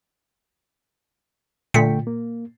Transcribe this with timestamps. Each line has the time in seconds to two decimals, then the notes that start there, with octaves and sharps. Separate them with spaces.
1.74 A#2 D3 A3 G5 B6 C#7
2.07 A#3